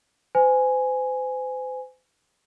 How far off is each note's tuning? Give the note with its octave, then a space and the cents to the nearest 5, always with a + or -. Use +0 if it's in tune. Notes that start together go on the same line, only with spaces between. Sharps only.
C5 -40 G#5 +0